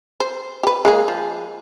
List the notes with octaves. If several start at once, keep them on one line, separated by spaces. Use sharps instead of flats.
C5
G4 B4
G#3 A#3 G#4
F3